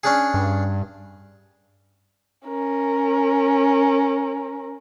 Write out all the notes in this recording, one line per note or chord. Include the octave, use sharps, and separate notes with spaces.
C#4 D4 G#4
G2
C#4 A#4